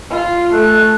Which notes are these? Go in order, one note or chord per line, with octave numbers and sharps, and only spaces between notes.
F4
A3 F#6